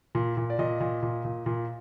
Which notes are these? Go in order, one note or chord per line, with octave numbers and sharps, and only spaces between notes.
A#2
A#2
D5
A#2 D#5
A#2
A#2
A#2
A#2